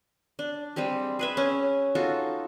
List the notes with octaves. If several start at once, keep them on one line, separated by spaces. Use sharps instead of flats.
D4
G3 G#3 C4 G4
G#4 B4 E5
C#4
D#4 F4 F#4 A4